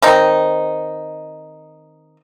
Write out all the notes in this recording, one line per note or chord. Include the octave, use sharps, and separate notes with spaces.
D#3 C4 D#4